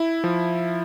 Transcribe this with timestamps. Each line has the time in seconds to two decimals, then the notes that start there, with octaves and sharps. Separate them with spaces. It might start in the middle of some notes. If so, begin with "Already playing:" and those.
Already playing: E4
0.24 F3